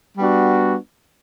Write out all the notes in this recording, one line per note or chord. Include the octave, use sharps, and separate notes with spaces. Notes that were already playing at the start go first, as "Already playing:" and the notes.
G3 B3 D4 F#4